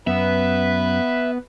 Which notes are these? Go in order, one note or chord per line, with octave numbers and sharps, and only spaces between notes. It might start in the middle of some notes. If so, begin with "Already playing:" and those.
F#2 B3 B4 E5 B5